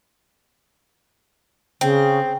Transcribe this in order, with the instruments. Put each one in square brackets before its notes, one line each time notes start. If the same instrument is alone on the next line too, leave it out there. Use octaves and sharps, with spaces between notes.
[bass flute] C#3 [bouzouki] C4